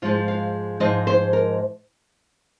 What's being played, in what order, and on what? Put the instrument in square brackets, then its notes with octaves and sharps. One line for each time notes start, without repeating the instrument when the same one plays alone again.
[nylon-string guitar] G#2 F3 G#3 F4
F5
G#2 F3 G#3 D#5
C5
A#4